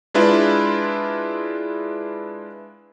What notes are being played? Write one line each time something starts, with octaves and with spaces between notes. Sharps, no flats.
G#3 D4 E4 F4 B4